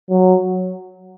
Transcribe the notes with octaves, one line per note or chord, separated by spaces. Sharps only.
F#3